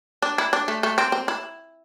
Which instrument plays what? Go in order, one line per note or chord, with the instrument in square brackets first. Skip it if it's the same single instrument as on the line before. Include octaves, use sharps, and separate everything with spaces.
[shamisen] D4
E4
D4
A3
A3
C4
C4
E4